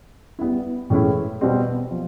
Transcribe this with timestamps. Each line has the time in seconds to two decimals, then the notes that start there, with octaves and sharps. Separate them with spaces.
0.39 G3 B3 E4
0.90 A2 E3 G#3 C#4 E4
1.41 B2 G3 C4
1.91 F3